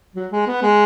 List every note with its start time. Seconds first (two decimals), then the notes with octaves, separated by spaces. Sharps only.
0.16 F#3
0.31 G#3
0.47 B3
0.62 G#3